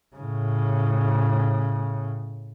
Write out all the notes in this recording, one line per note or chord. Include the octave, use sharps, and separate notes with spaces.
A2 C#3